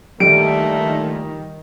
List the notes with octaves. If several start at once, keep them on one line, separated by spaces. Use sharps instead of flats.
A#2 D3 D#3 G3 A3 D7